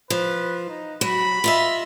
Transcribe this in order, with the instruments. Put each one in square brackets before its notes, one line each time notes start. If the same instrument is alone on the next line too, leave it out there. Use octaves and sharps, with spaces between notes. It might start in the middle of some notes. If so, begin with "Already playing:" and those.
[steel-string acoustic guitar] F3 [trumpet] B4
[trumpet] D#4
[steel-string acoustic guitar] F#3 F#4 [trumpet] B5
[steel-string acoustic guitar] F4 D#5 E5